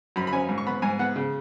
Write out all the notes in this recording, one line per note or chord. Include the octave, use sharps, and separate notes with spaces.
F#2 B5
B5
C#4 G#5
G#2
C#6
B3 B5
G#2 G#5
B3 F#5
C#3